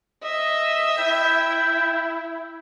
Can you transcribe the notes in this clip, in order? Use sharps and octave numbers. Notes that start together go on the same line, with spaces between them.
D#5 E5
E4 G5